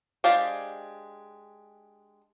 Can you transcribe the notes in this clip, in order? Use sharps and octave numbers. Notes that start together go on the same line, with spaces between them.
G#3 D4 G4 C5 F5